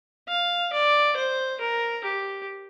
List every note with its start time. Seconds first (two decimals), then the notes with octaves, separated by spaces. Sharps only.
0.29 F5
0.73 D5
1.16 C5
1.61 A#4
2.04 G4